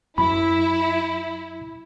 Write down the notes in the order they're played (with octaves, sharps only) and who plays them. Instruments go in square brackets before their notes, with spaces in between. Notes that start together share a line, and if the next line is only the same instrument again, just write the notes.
[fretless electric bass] F#2 [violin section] E4 [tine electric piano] B5